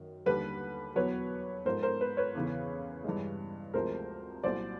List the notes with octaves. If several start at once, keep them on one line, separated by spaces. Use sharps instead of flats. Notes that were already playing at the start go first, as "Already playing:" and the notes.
Already playing: F#2 D#3
D#2 D3 G3 B4
E2 B2 F#3 B4 C#5
G#2 F3 G#3 A#4 C5
A#4 C5
B4
B4 C#5
E2 C#3 E3
G2 E3 G#3
D2 C3 F3 G#3 A#4 C5
C2 A#2 F#3 C5 D5